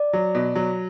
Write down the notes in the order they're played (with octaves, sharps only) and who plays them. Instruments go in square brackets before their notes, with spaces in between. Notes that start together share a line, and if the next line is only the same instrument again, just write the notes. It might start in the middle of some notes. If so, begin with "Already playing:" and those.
Already playing: [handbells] D5
[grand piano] F#3
B2
F#3